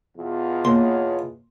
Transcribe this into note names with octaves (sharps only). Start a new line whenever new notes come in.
E2 B2 F4
D#2 C#5 C6